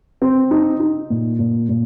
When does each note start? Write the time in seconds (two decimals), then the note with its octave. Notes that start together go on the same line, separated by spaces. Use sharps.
0.22 C4
0.51 D#4
0.80 D#4
1.10 A#2
1.39 A#2
1.69 A#2